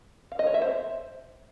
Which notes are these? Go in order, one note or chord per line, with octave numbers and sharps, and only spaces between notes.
F5
D#5
C#5
E5
C5